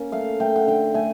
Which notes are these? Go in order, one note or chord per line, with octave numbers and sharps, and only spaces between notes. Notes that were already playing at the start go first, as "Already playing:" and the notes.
Already playing: A#3 C#4
A3 F5
A3 G5
F#5
D3 G5
A3 G#5